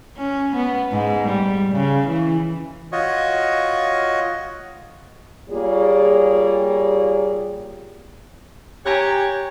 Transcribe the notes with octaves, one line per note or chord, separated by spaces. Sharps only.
C#4
B3
G#2
G3
C#3
E3
F4 F#4 C#5 D#5
G3 A#3 F4 G#4 C#5
G4 C#5 G#5 A#5 F#6